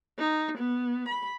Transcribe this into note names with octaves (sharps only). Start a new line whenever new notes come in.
D#4
B3
B5